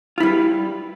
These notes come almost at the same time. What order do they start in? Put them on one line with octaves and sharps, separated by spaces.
F4 E4 G3 B4